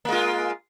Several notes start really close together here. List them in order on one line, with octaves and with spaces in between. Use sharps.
A#3 G#3 F4